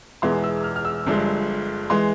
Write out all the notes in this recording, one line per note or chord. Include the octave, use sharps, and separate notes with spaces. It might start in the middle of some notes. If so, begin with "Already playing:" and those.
E1 E2 E3 G#3 C6
E6
F6
F6
E6
G1 G2 F3 G#3
E3 G#3 C6